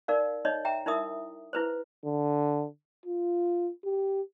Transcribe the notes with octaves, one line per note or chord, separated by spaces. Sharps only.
D#4 A#4 D5 F5
D#4 C#5 D#5
E5 G5 A#5
D#4 E4 A#4 E5 D#6
E4 B4 C5
D3
F4
G4